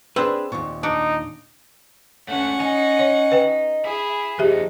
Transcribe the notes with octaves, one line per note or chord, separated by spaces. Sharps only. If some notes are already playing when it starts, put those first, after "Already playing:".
C4 D4 G#4 B4 E6
D#2 A#2 C#6
D4 D#4 C#7 D7
A3 C#4 F#4 F#5
D#4 G#5
C#5
B4 G5
G#4 E5 B5
F3 D#4 G4 G#4 E5